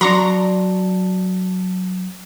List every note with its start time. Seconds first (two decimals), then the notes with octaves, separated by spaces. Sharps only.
0.01 F#3 D4 A#5 C6 C#6